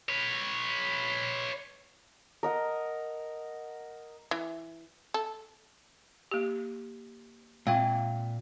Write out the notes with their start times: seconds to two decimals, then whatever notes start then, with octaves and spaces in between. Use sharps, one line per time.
0.09 B4 C#5
2.43 A#4 D#5 F#5
4.31 E3
5.14 A4
6.31 A#3 G4
7.67 A#2 G#3 C4 F4 F5 G5